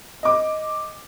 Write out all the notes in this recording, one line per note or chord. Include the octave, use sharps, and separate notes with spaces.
D#5 D6